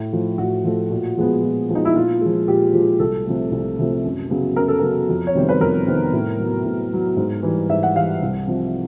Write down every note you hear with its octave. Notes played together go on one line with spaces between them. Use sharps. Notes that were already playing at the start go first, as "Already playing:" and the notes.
Already playing: A2
F3 A3
A2 F#4
F3 A3
A#2
F3 G#3 B3
A#2
F3 G#3 B3
D#4
E4
A#2 F4
F3 G#3
A#2 G4
F3 G#3
C2 A4
C3 F3 A3
C2
C3 F3 A3
F#2
C#3 F#3 B3
F#2 A#4
A4
C#3 F#3 B3 A#4
F2
C#5
C3 D#3 G3 B3 C5
B4
F2 A#4
C3 D#3 G3 B3
A2
F#3 B3
A2
F#3 B3
G#2
E3 G3
G#2 E5
F#5
E3 G3 F5
C2
C3 F3